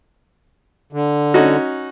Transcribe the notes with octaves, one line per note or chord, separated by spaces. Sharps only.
D3
C#4 D#4 F#4